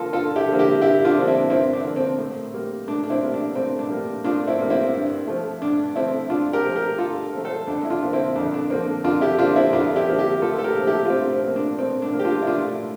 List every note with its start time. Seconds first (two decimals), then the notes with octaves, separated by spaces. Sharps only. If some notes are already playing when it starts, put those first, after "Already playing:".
Already playing: G2 D3 F3 A#3 F4 A4
0.13 G2 F4 A4
0.36 E4 G4
0.47 D3 F3 A#3
0.59 E4 G4
0.81 G2 E4 G4
1.05 D4 F4
1.16 D3 F3 A#3
1.28 C4 E4
1.50 G2 C4 E4
1.73 D4
1.84 D3 F3 A#3
1.96 C4
2.18 A2
2.54 G3 A#3
2.88 A2 D4
3.03 D4
3.10 C4 E4
3.22 G3 A#3
3.34 D4
3.56 A2 C4
3.79 D4
3.90 G3 A#3
4.24 A2 D4 F4
4.47 C4 E4
4.59 G3 A#3
4.70 C4 E4
4.94 G2
5.27 F3 A3
5.62 G2 D4
5.96 F3 A3 C4 E4
6.30 G2 D4 F4
6.53 G4 A#4
6.64 F3 A3
6.76 G4 A#4
6.98 G2 F4 A4
7.33 F3 A3
7.45 A4 C5
7.67 F2 D4
7.85 E4
7.90 D4 F4
8.02 D3 F3 A#3
8.13 C4 E4
8.36 F2 D4
8.54 D4
8.70 D3 F3 A#3 C4
9.04 F2 D4 F4
9.21 E4 G4
9.39 D3 F3 A#3 D4 F4
9.56 C4 E4
9.73 F2 D4 F4
9.96 E4 G4
10.08 D3 F3 A#3
10.18 E4 G4
10.42 A2 F4 A4
10.58 A4
10.64 G4 A#4
10.76 F3 A#3
10.87 E4 G4
11.05 F4
11.10 A2 C4 E4
11.33 C4
11.45 F3 A#3
11.56 D4
11.79 A2 C4
12.02 D4
12.13 F3 A#3
12.19 G4
12.25 D4 F4
12.42 E4
12.47 A2 D4 F4